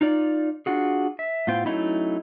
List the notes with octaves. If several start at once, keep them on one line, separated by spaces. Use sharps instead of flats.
D#4 F4 D5
D4 F4 F#4 G#4
E5
A2 B3 F4 C5 G5
F#3 A3 C#4 D#4 E4